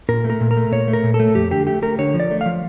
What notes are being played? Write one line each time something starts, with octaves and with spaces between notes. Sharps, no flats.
A#2 A#4
A3
A#4
A#2
A#4
A3
A#2 C#5
A3
A#4
A#2
A4
A3
F2 G4
D3 G4
A3 G4
A3 A#4
D3 C#5
F3
D5
A3
F5
F3